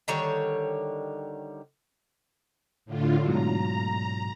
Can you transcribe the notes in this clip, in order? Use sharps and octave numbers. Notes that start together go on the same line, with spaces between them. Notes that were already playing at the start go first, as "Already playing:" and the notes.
D3 D#3 G3 C#5
A2 D3 F4
G#2 B2 F#3 A#5